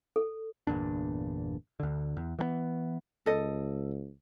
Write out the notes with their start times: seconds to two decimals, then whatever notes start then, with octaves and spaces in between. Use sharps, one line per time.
0.16 A4
0.67 G1 E2 A#2 D4
1.80 D2 D3
2.17 E2
2.39 E3 F#3 B3
3.26 C#2 A4 D#5